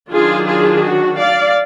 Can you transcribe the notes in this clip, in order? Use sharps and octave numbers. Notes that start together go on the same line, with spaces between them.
D#3 F#3 D4 F4 G#4
F4 G#4
F#4
D5 F5